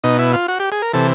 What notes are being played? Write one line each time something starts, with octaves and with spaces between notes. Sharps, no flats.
B2 D#4
E4
F4
F#4
G4
G#4
A#4
C3 E3 A4